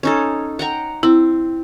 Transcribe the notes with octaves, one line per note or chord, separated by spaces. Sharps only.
C#4 D#4 A4
F#5 G5 A#5
C4 E4